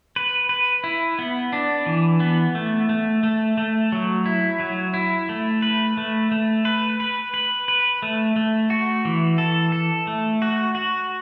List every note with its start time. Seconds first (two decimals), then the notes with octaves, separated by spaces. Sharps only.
0.16 B4
0.49 B4
0.84 E4
1.19 B3
1.53 D4
1.86 E3
2.20 B3
2.55 A3
2.89 A3
3.23 A3
3.58 A3
3.92 F#3
4.26 E4
4.60 F#3
4.94 E4
5.29 A3
5.62 B4
5.97 A3
6.32 A3
6.65 B4
7.00 B4
7.34 B4
7.68 B4
8.02 A3
8.36 A3
8.70 F#4
9.05 E3
9.38 A4
9.72 A4
10.07 A3
10.42 F#4
10.75 F#4